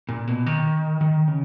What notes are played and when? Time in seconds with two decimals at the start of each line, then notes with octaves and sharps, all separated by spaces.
0.09 A#2
0.28 B2
0.46 D#3
1.01 D#3
1.28 C#3